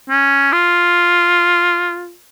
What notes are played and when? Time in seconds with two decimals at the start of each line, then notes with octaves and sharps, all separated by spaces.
0.10 C#4
0.52 F4